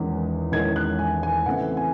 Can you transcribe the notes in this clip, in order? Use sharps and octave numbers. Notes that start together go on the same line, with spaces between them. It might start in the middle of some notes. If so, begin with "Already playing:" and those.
Already playing: E1 E2 D#3 G#3 C#4
E1 E2 D#3 G#3 C#4 G#6
F#6
G#5
G#5
E2 C#3 E3 A3 C4 F#5
G#5